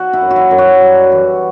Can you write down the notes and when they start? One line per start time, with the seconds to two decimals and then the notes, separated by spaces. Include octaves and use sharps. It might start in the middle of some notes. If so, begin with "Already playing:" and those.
Already playing: F#4
0.13 E4
0.21 F#2
0.30 F#4
0.36 E4
0.51 F#2
0.58 F#4
0.81 G3
1.12 E3